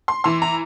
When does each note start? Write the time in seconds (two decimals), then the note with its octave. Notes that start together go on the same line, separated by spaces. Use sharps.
0.08 C6
0.24 E3 C6
0.42 A#5